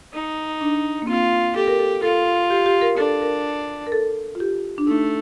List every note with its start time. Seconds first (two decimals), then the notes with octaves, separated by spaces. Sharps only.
0.13 D#4
0.61 D4
1.02 A#3
1.07 C4 F4
1.56 G4 A4
1.68 A#4
1.79 A4
2.02 F4 A4
2.50 G4
2.66 G4
2.82 A#4
2.97 D4 A4
3.22 A#4
3.87 A#4
3.92 A4
4.35 F4
4.40 G4
4.78 D4
4.87 A3 D#4